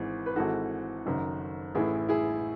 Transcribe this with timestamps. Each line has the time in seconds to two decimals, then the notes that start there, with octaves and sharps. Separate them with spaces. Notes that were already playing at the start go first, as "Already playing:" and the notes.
Already playing: G#1 G#2 E3
0.26 B4
0.36 G#1 G#2 E3 F#4 A4
1.06 F#1 F#2 D#3
1.75 A1 A2 E3 E4 G#4
2.09 E4 G#4